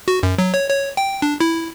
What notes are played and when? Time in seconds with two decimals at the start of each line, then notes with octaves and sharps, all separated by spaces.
0.08 F#4
0.23 F#2
0.38 F#3
0.54 C#5
0.69 C#5
0.97 G5
1.22 D4
1.40 E4